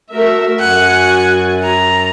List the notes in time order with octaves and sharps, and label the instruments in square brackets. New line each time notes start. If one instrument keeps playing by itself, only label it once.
[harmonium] A3 [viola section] F#4 A#4 E5
[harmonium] F#2 [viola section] F#4 G#5 [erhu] F#5
[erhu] A#5